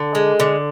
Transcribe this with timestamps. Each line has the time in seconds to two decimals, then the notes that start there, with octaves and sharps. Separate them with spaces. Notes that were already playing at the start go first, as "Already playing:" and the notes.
Already playing: D3
0.15 G#3
0.40 D3